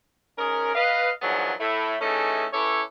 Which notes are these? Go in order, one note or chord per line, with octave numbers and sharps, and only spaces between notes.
G#2 C#4 G#4 A#4
B4 D#5 F5
D#3 F3 F#3 B3 D4 G#4
A2 A3 E4
E3 A3 C#4 D#4 G#4 A4
C#4 E4 G4 A4 B4 C#5